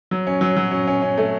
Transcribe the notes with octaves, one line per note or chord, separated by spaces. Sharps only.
F#3
C#4
F#3
F#3
C#4
C#4
C#4
A3